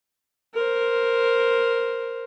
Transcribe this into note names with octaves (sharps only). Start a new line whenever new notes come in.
A#4 C5